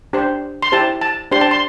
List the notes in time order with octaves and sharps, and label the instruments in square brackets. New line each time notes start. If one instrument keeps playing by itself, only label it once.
[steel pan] D4 G4 C5
C6
E4 G4 C5 A5
A5
D4 G4 C5 C6
A5
C6